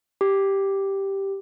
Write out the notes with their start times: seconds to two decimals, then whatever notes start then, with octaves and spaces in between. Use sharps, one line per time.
0.21 G4